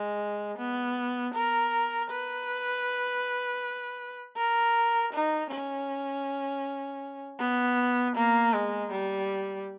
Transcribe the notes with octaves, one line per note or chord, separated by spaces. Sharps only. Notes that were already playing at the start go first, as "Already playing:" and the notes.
Already playing: G#3
B3
A#4
B4
A#4
D#4
C#4
B3
A#3
G#3
G3